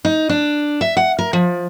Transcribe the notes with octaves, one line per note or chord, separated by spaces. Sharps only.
D#4
D4
E5
F#5
A#4
F3